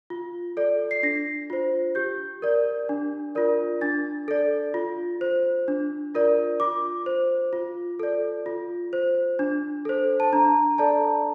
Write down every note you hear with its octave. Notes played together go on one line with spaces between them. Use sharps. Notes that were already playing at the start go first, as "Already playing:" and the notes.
F4
A4 D5
C7
D4 A#6
F4 C5
G4 G6
A#4 D5
D4
F4 A#4 D5
D4 A6
A4 D5
F4
C5
D4
F4 A#4 D5
F4 D6
C5
F4
A4 D5
F4
C5
D4
A4 C5
A5
D4 A#5
A4 D5 A5